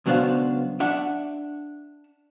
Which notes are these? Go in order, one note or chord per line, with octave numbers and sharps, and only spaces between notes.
C#2 F#3 B3 D4 C5 F5
D4 E5 F#5